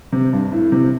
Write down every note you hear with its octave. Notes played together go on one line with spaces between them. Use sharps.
C3
G2
A2
C3